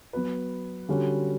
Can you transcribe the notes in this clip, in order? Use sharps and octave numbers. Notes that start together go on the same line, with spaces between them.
F#3 B3 F#4 B4
D3 G3 C#4 F#4